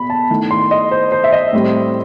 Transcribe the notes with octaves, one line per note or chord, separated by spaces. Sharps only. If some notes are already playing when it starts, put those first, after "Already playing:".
Already playing: B2 B5
A5
D#3 A3 E4
C6
D#5
C5
C5
E5
D#5
A2 G3 C4